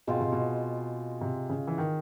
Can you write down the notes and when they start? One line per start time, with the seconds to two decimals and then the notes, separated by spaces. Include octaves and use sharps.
0.07 B2 G#3 C4 F4
0.20 C3
0.32 B2
1.21 C3
1.49 C#3
1.67 E3
1.78 D#3